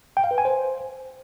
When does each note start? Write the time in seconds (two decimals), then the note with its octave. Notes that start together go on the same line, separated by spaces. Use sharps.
0.17 G5
0.24 F5
0.31 B4
0.38 G#5
0.45 C5